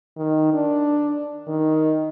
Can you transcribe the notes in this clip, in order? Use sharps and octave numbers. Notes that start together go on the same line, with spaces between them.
D#3
D4
D#3